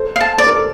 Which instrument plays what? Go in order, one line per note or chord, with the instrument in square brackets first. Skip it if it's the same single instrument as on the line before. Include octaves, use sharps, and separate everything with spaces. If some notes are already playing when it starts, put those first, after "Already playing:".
Already playing: [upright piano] A4 C5
[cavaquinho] F5
A5
[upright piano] C5 [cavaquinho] D5
[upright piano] A#4
A4